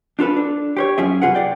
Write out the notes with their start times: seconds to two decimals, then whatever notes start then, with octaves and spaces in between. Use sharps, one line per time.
0.19 D4 F4 A4 B4
0.37 D4
0.77 G4 C5 C#5
0.98 F#2 C#4 F4 G#4 E5
1.22 F#2 C3 F4 G#4 B4 F#5
1.35 G#4 D5 G5